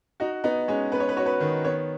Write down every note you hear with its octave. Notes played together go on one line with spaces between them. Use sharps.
D#4 F#4
B3 D#4
G#3 C#4
B3 B4
C#5
B4
F#4 C#5
B4
D#3
B3 C#5